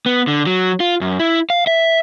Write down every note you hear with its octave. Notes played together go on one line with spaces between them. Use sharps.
B3
D3
F#3
F4
F#2
E4
F5
E5